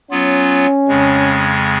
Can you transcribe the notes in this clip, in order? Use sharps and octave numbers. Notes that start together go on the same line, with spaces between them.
F#3 B3 C#4 F4
F2 C#3 G#3